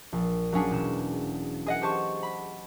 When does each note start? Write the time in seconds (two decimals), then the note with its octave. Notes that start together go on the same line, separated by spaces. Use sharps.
0.12 A#1
0.53 F#3 A#3 C#4 D4 G#4
0.71 E1 E7
1.66 G#4 D#5 F#5
1.82 G4 C5 A5 C#6
2.23 B5